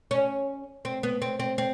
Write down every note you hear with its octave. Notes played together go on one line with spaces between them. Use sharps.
C#4
C4
B3
C4
C4
C4